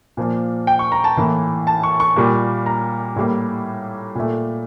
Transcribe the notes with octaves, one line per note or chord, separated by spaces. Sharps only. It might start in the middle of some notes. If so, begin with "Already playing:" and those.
A#2 F3 A#3
G5
C#6
A#5
A5
A2 E3 A#3
A5
C#6
C#6
A#2 G3 A#3
A#5
A2 G3 A#3
A#2 A3